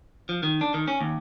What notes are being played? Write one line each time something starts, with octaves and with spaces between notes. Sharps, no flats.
F3
D#3
D4
D#3
C#4
D#2